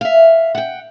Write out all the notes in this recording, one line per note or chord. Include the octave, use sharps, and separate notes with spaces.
E5 F5
F#5 G5